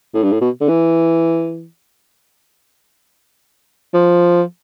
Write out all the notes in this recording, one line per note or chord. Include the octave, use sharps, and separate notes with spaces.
A2
G2
A2
B2
D3
E3
F3